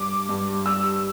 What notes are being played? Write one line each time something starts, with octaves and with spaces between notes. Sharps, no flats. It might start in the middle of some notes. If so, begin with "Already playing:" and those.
Already playing: G2 D6
G2
G3 E6